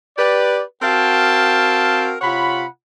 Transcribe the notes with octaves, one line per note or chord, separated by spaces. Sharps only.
G4 B4 D5
C4 F#4 A#4 F5 G5 A5
C3 F4 C#5 F#5 B5